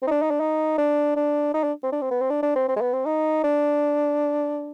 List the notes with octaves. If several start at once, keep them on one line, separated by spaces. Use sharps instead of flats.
C4
D#4
D4
D#4
D4
D#4
D4
D4
D#4
D4
C4
D4
C4
B3
C4
D4
D4
C4
C4
G#3
B3
C4
D#4
D4